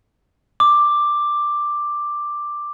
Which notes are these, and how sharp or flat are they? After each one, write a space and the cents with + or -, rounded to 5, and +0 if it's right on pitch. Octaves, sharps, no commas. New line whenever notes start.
D6 +5